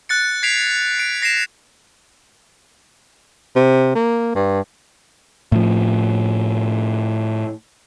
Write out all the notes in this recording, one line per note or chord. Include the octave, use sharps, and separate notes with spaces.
F#6 A6 C#7
G#6 B6 C7 D7 F7
C7 D7
A#6 C7 D7 E7
C3
A#3
G2
A2 F3